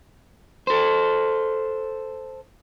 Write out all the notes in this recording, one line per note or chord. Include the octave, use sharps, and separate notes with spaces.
A4 C5